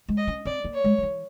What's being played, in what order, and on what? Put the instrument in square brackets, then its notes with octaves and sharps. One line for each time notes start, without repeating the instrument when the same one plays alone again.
[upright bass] G#3
[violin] D#5
[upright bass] C#4
[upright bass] C4 [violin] D5
[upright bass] A#3
[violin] C#5
[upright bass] G#3
F3
E3